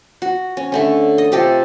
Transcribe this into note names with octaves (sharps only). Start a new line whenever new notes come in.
F#4
C#4
D3 A3 C#4
D#5
C3 F4 G4 A4